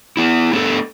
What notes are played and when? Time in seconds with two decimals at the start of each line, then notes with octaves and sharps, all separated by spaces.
0.17 B3 E4
0.53 A3 B3 D4 G4 A4